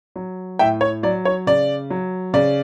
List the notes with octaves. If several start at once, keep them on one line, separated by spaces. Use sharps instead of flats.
F#3
A2 E5 G5
C#5
F#3 D5
C#5
C#3 D5
F#3
C#3 D5